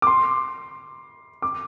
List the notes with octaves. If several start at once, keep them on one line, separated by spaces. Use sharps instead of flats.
D6
C6
D6